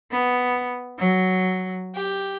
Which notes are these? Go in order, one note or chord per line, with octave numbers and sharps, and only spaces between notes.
B3
F#3
G4